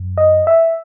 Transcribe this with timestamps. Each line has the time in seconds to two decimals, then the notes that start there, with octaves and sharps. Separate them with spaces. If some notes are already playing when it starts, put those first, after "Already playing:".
Already playing: F#2
0.18 D#5
0.47 E5